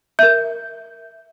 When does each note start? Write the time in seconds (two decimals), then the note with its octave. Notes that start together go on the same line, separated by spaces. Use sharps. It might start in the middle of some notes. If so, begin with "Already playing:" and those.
0.19 A#4 E5 G6